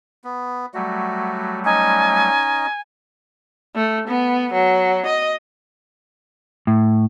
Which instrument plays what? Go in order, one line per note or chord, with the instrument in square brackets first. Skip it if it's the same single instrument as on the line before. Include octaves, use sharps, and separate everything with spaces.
[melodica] B3
[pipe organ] F#3 G3 A3 [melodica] F#4
[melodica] C#4 D#4 D#5 [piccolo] G#5
[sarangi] A3
B3
F#3
D#5
[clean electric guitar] A2